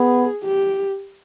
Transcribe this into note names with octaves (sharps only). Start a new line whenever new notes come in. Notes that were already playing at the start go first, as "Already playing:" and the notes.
Already playing: B3 G#4
G4